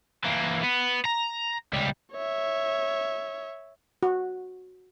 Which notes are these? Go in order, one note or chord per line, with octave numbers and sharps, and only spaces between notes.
E3 A#3
B3
A#5
C#2 G3
C#5 E5
F#4